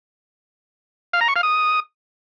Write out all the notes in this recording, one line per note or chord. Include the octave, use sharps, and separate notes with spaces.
F5
A#5
C#6
F5
D#6